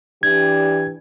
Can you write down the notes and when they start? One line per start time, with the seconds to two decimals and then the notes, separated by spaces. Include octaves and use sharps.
0.23 E3 D4 G4 G#6